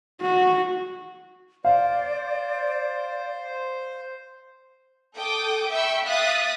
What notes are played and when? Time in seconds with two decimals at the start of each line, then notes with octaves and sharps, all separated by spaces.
0.22 F#4
1.65 C5 D5 F5
5.16 A4 G5 D6 D#6
5.71 E5 G5 B5 C#6 E6
6.07 E5 F5 D#6 F#6 A6 B6